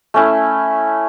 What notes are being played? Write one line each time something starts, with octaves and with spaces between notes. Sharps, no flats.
A3 C#4 E4